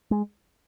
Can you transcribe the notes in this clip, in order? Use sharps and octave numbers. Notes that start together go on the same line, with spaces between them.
G#3